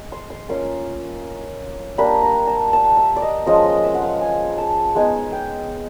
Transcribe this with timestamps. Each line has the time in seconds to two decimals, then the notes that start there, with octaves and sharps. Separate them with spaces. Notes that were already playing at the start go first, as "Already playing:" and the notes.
Already playing: G#3
0.12 C6
0.30 C6
0.49 A#3 C#4 F4 C6
1.98 G3 A#3 D4 B5
2.23 A#5
2.47 A5
2.73 A5
2.97 E5
3.16 D5
3.22 D#5
3.46 F3 G#3 C#4 D#5
3.65 D#5
3.84 E5
3.95 F#5
4.02 F5
4.21 G#5
4.58 A5
4.95 G#3 B3 D#4 G#5
5.32 G5